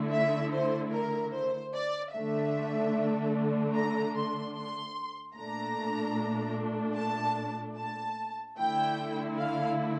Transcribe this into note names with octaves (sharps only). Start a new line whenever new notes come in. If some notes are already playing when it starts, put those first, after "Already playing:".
Already playing: D3 A3 E4
E5
C5
A#4
C5
D5
D3 A3 D4 E5
A#5
C6
C6
A#2 A3 D4 A#5
A5
A5
D3 A3 E4 G5
F5